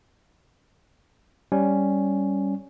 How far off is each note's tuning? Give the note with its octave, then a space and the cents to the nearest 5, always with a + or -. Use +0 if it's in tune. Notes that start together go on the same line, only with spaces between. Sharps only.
G3 +0 C#4 +5